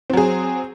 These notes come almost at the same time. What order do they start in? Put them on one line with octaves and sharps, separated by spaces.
C4 F#3 G#4